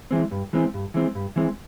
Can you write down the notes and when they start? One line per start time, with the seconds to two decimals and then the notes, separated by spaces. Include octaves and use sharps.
0.11 E3 G#3 C4
0.31 G2
0.53 E3 G#3 C4
0.74 G2
0.94 E3 G#3 C4
1.15 G2
1.36 E3 G#3 C4